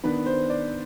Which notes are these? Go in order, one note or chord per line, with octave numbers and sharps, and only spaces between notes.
D#3 B3 D4 B4
C5
D5